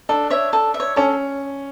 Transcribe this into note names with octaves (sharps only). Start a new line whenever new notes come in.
D4 A4
C#5 E5
A4
E5
C#5
C#4 A4